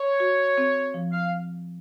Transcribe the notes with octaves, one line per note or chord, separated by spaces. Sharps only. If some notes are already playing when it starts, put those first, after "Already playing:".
Already playing: C#5
F#4
C4
F3
F5